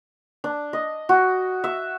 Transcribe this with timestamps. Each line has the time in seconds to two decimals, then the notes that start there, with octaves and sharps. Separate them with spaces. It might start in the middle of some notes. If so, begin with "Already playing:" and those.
0.44 D4
0.73 D#5
1.09 F#4
1.64 E5